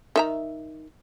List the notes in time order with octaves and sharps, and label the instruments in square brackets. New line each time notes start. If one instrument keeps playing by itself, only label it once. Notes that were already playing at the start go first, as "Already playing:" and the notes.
[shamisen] D#3 E5 A#5